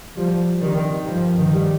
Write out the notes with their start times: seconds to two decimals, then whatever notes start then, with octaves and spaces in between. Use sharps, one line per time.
0.16 F3 G3
0.61 D#3 C4 G4 D5
1.06 G2 F3
1.37 D#3
1.51 D#3 G3